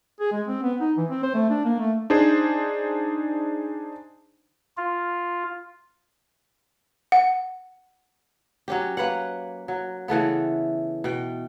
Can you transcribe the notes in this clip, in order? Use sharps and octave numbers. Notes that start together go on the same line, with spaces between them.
G#4
G#3
C4
B3
D#4
E3
C4
C5
A3
D4
A#3
A3
D4 D#4 G#4 C5
F4
F#5
F#3 C#4 G4
A#3 B4 C#5 F#5
F#3
C#3 E3 A3 B3
B2 G5